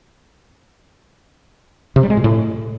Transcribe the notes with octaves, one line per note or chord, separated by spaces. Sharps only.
C3
G3
G#3
A#2
A2